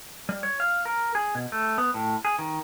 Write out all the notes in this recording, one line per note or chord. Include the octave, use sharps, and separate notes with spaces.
G3
C#5
F5
A#4
G#4
B2
A3
B3
A2
G#4
D#3